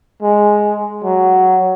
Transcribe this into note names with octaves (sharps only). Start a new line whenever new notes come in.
G#3
F#3